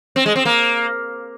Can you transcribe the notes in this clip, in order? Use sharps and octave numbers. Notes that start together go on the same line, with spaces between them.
C4
G#3
C4
A#3